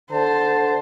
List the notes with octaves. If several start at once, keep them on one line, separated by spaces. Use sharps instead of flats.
D3 C5 A5